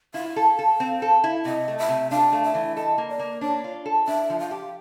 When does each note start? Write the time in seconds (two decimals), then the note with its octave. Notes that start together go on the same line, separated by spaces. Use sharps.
0.14 E4 F5
0.36 A4
0.59 A4
0.80 C4
1.02 A4
1.24 E4
1.45 C3 D#5
1.68 A3
1.78 E5
1.89 C3
2.11 D4 F5
2.32 A3
2.44 E5
2.55 E3
2.76 A4 D#5
2.98 A#3
3.09 D5
3.19 A#3
3.41 D4 C#5
3.64 F4
3.86 A4
4.07 D4 E5
4.30 F3
4.40 F5
4.51 G4